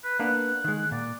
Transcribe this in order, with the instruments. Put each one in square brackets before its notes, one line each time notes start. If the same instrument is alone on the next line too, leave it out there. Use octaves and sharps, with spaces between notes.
[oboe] B4
[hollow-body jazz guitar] A#3 B3 D4 [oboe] F#5
[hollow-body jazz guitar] D#3 G#3
[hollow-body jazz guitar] A#2 [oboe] D5